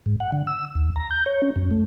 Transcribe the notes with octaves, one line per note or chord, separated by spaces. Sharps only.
G#2
F#5
D3
E6
D#2
A#5
G6
C#5
C#4
F#2
A3